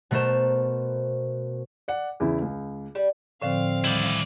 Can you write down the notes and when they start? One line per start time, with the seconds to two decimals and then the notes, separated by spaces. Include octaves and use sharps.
0.11 B2 A3 A#4 C5 E7
1.88 D5 F#5
2.20 E2 C#3 E4
2.42 C#2
2.95 G3
3.42 A2 D3 F3 C4 F5
3.84 D#3 G3 E4 D5